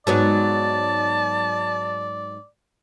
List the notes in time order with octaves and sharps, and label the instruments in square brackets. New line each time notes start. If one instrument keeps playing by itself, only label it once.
[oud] G#2 F#3 B3 [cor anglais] D5 [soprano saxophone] A5